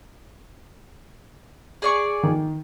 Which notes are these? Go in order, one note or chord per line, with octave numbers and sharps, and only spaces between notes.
G#4 D5 C#6
D#3